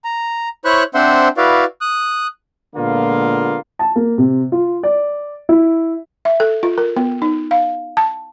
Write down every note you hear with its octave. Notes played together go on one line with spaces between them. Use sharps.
A#5
E4 C5 C#5 B5 C#6 F#6
C4 D4 C5 E5 F#5 C6
E4 F#4 B4 D5 F5
D#6 F#6
A#2 D3 G#3 A#3 B3 F4
A5
A#3
C3
F4
D5
E4
E5
A4
F4
A#4
B3
D#4
F5
A5